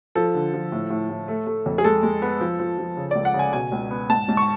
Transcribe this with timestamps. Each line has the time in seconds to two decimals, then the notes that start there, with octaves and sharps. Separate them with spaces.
0.15 F3 A4
0.34 D3
0.54 F3
0.72 A2
0.90 A2
1.10 A2
1.28 A3
1.47 A3
1.66 F2
1.78 G#4
1.84 G#3 A4
2.03 G#3
2.22 B3
2.41 F3
2.59 F3
2.78 F3
2.97 C#3
3.11 C#2 D5
3.25 F#5
3.34 C#3
3.39 G#5
3.53 B2 G#5
3.72 C#2
3.91 B3
4.09 G#2 A5
4.28 G#2
4.37 C#6